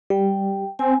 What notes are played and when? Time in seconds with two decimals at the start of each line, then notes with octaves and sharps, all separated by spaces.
0.10 G3 G5
0.79 C4 G#5